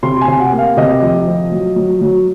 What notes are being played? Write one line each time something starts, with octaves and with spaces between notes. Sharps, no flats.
C3 C6
G#5
C3
F#5
A#3
F5
C3 D#5
F2
F3
F#3
F#3
F#3